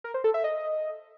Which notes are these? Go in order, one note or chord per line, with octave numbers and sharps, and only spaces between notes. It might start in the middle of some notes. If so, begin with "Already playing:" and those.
A#4
C5
A4
E5
D#5